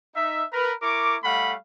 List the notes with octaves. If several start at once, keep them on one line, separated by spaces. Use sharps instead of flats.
D#4 E5
A#4 B4
E4 A#4 C#6 D6
G3 A3 F5 F#5 B5